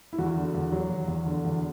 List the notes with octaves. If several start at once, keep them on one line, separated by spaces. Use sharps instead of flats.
E4
E2 F#4
D3
E2
F#3
E2
E2
D3
E2